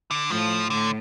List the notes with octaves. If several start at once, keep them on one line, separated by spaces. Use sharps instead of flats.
D3
A2 F3
A2 D3